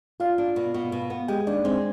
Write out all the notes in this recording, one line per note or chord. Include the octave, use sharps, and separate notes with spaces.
D4 F4 F5
D4
B2
B2
B2
B3
G#3 G4 G5
D#2 D4 D5
G#3 C4 C5